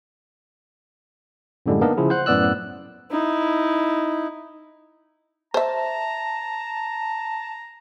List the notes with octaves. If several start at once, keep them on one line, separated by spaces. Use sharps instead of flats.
F#2 A2 D3 G3 G#3
A#3 B3 D4 D#4 A#4
C#3 F3 E4 G#4
C5 F#5 F#6
F#2 A2 B3 D5 E6 F#6
D#4 E4
C5 E5 A5 A#5